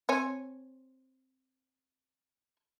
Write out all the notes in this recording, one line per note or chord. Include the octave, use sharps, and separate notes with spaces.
C4 C#5 G#5